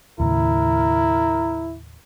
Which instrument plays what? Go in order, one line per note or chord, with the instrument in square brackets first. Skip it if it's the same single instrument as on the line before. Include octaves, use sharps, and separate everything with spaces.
[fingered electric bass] D#2 A2 C#3 [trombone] E4 [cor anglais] A#4